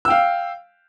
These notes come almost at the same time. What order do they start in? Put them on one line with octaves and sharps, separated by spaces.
E6 G5 F5